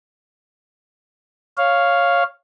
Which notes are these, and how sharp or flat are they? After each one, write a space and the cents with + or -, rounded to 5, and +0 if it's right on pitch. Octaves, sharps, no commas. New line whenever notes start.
C#5 +0 F5 +0